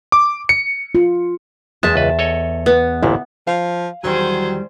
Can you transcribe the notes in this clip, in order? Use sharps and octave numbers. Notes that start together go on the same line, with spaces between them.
D6
C#7
F4
E2 G#3 E5 A5
C#2 B4
A4 C#5 D#5
B3
A1 D2 A#2 E4
F3 F5
E2 D#3 F#3 G3 G#4 C5